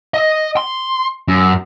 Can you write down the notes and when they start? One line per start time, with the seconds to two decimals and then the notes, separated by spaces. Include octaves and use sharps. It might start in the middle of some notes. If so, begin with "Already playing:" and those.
0.14 D#5
0.57 C6
1.28 F#2